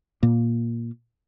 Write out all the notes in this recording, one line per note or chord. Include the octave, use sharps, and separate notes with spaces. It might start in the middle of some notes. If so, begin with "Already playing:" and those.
A#2 A#3